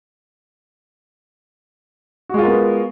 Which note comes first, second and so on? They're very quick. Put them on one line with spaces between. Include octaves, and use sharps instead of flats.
F#4 G#3 F4 A#4 B3